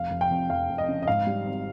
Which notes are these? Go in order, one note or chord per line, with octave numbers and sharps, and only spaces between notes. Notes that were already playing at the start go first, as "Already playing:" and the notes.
Already playing: F1 F5
F1
G5
F2
F1 F5
F1
D#5
C#3
D#5
G#2 F5
G3
G#1